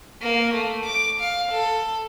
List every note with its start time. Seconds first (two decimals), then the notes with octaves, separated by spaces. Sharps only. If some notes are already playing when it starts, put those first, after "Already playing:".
0.22 A#3
0.54 A3
0.86 D6
1.20 F5
1.51 A4